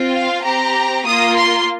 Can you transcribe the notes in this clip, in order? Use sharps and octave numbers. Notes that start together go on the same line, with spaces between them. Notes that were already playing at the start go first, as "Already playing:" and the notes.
Already playing: C4 F4
F5
C4 G4 A#5
A#3 F4 D#6
C6